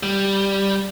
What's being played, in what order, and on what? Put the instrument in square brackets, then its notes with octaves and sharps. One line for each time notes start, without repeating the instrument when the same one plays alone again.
[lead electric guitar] G3